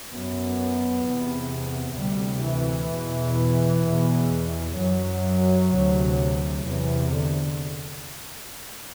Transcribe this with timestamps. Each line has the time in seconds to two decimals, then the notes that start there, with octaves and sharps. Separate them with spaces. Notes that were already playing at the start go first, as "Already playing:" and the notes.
0.10 F#2 B3
1.03 E2 C3
1.97 D2 C3 G3
2.44 E3
2.91 E2 B2
3.83 E2 B2
4.77 F#2 F#3
5.71 D2 C3
6.64 E2 C3 E3
7.11 D3